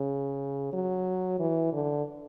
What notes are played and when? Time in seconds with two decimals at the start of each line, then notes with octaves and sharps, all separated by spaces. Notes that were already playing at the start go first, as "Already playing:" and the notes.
Already playing: C#3
0.73 F#3
1.39 E3
1.73 D3